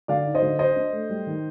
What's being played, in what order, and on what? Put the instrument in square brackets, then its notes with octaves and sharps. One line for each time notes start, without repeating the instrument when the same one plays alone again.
[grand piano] D3 D5 F5
D#4
C5 D#5
D3
D4 C5 D#5
D4
A3
G3
D#3